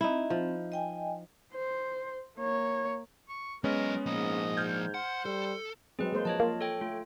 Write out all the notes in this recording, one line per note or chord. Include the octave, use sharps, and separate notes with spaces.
C4 D#4 E4
F3
D#5 G5 G#5
C5
A#3 C#5
C#6
F#3 G#3 B3 C#4 A#4 D#5
G#2 F3 A#3 D#5
F6 G6 G#6
C5 F#5
G3 A4
F#3 G#3 C4 G#4 B4
G#3 A#3 C5
F3 C#5 D#5 A5
A#3 F4
A4 C#5 G5
A3 F4